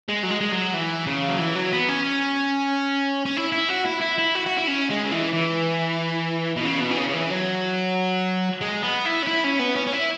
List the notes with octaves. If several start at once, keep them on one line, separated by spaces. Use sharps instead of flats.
G#3
F#3
G#3
G#3
F#3
E3
C#3
F#3
E3
F#3
B3
C#4
C#4
E4
E4
F#4
E4
E4
E4
F#4
F#4
E4
C#4
G#3
C#3
E3
E3
B2
C#3
B2
E3
C#3
C#3
E3
F#3
G#3
B3
E4
C#4
E4
C#4
B3
C#4
C#4
E4